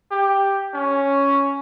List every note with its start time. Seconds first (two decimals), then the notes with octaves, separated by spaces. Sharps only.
0.11 G4
0.74 C#4